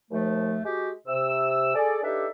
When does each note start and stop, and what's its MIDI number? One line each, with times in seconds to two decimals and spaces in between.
0.11 0.58 39
0.11 0.58 53
0.11 0.58 57
0.65 0.91 56
0.65 0.91 66
0.65 0.91 67
1.07 1.75 48
1.07 1.75 88
1.75 1.99 68
1.75 1.99 69
1.75 1.99 74
2.03 2.27 62
2.03 2.27 63
2.03 2.27 67
2.03 2.27 69
2.03 2.27 71
2.03 2.27 76